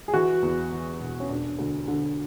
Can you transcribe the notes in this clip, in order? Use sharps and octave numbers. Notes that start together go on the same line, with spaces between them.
G#4
E3 F#4
E2
E3
E1
C#4
E1 D4
D2
D3